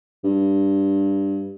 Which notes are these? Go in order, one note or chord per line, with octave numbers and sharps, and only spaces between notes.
G2